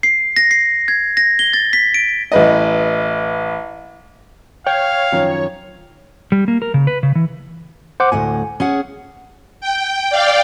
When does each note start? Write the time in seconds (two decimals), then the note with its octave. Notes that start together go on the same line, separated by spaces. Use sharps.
0.03 C7
0.36 A#6
0.51 C7
0.88 G#6
1.17 A#6
1.39 G7
1.53 A6
1.73 B6
1.94 D7
2.32 A1 B4 D#5
4.66 C#5 F5 G5
5.12 F#2 D#3 F3
6.32 G3
6.48 A#3
6.62 A#4
6.74 C#3
6.87 B4
7.03 C#3
7.15 E3
8.00 C5 F#5 D6
8.12 D2 A2 F#5 G#5
8.60 C#4 G#4 F#5
9.61 G5
10.10 D5 F5 G5